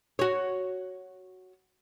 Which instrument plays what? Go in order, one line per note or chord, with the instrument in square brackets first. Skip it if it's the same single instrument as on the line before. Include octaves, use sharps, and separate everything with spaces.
[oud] F#4 C#5